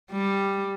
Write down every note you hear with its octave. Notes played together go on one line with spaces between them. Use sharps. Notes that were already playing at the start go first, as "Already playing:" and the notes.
G3